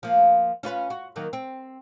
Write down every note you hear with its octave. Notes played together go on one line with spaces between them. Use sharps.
F3 A#3
C#4 F4 B4
F#4
D#3 F#3 A#3
C4